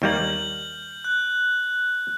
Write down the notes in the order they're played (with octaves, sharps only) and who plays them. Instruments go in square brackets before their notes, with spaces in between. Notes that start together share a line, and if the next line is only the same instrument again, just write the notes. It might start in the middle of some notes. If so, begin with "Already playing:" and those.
[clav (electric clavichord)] D#2 G3 A#3 [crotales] F6 G6 F#7
[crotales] F#6